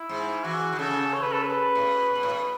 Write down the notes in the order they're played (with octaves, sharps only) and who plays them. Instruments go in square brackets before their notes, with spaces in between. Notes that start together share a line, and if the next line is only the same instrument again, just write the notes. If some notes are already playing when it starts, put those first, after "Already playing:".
Already playing: [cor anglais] E4
[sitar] G#2
[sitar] E3 [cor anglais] F#4
[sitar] D#3
[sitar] C#3 [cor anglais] A4
[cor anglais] C#5
B4
A4
B4
[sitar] A2
B2
B2
A2
B2